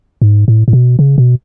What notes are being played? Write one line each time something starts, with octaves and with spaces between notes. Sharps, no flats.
G#2
A2
A2
B2
C#3
B2